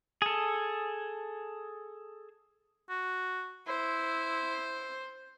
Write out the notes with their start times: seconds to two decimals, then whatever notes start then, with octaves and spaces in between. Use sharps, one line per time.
0.22 G#4 A4
2.90 F#4
3.68 E4 C5